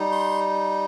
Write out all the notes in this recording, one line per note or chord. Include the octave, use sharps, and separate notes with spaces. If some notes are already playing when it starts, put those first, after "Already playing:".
Already playing: G3 D#4
C6